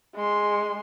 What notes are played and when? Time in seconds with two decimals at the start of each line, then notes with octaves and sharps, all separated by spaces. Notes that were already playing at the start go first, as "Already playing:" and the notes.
0.15 G#3 C6